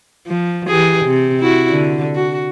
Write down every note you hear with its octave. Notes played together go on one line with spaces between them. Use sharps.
F3
E3 G4 G#4
C3
E4 F#4
D3
F#4